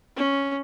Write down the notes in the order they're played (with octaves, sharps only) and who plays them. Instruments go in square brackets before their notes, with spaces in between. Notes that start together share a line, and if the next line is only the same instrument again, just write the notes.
[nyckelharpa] C#4